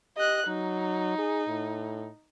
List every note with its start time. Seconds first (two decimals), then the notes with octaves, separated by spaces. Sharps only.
0.17 G4 D#5 F#6
0.47 F#3 D#4
1.18 G#4
1.48 A2